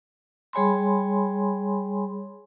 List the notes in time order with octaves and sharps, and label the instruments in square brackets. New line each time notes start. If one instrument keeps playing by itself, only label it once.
[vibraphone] G3 G#4 C#5 G#5 B5 C6